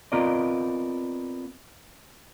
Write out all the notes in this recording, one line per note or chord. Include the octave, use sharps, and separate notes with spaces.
B3 C4 F4 A#4 D5 D#5